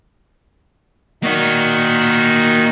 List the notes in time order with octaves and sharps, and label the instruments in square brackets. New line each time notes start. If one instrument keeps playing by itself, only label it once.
[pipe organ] D#3 D#4 F#4 [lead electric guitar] A#3 D5